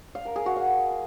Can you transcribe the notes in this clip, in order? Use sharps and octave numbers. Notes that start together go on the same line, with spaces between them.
F5
A#4
G#4
F#4
F5